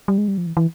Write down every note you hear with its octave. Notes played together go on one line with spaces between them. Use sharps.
G3
G#3
G3
F3
E3
E3